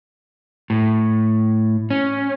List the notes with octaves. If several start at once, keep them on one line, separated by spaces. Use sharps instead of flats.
A2
C#4